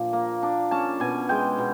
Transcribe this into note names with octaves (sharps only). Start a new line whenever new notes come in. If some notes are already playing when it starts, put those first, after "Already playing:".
Already playing: A#2 F3 D4
A#3
D4
C#4 A5
B2 G#5
G#3 G5
B2